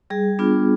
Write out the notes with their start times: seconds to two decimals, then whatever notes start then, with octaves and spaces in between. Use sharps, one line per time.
0.10 G3 G#4
0.39 B3 D4 F4